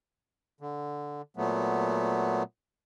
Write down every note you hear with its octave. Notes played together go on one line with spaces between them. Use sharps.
D3
A#2 F#3 A3 B3